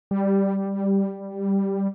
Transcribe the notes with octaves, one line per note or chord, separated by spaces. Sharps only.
G3